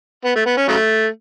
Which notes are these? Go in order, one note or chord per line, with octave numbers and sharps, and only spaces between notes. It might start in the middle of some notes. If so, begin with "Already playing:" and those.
B3
A3
B3
C#4
C#3 F#3 A3